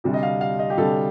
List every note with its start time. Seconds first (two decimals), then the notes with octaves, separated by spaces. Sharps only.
0.04 D2 C3 G3 D4
0.14 D#5
0.23 F5
0.41 F5
0.59 D#5
0.70 G4
0.78 D2 C3 G3 D4 A4